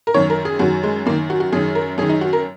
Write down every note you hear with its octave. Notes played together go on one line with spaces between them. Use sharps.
A#4
F#2 D#3 C#5
A#4
G#4
F#2 D#3 F#4
G#3
F#2 D#3 A#3
F#4
F#4
F#2 D#3 G#4
A#4
F#2 D#3 G#4
D#4
F#4
A#4